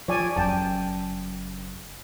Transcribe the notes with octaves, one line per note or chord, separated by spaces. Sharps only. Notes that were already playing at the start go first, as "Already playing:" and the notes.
F3 C#5 D5 G#5
F#1 F#2 G5 A5